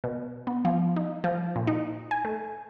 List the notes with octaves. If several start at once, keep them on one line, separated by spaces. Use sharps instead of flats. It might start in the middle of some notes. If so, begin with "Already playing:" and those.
B2
B3
F3
D#4
F3
A#2
D#4
G#5
A3